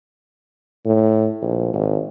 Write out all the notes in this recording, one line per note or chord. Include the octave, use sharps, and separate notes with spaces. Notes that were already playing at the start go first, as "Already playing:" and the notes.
A2
A#1
G#1